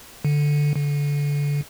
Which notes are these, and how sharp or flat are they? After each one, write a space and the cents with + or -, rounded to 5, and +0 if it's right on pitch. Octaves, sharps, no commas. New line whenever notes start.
D3 +0
D3 -25